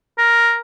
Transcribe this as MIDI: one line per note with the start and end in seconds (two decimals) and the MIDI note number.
0.18 0.58 70